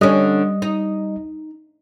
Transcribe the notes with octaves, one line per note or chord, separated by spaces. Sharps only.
D3 G3 C#4 D#5 D#6
D#4